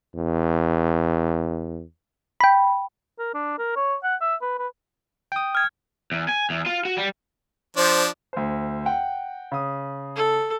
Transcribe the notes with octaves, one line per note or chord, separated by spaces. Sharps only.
E2
G5 B5
A#4
D4
A#4
C#5
F#5
E5
B4
B4
G5 D#6
F6 G#6
E2
G#5
E2
F4
F#4
G3
F3 D4 C5
D2 C5
F#5 G5
C#3 D#6
A4